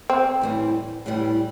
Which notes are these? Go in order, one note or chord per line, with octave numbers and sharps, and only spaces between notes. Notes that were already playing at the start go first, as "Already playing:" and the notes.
C4
A2 E3 G3
A2 E3 G3